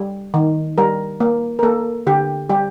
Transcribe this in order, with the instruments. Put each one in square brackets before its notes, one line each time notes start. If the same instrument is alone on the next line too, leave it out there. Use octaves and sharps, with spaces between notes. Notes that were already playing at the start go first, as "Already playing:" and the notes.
Already playing: [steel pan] G3
D#3
G3 A#4
A#3
A#4
A#3 A4
D3 G4
G3 G4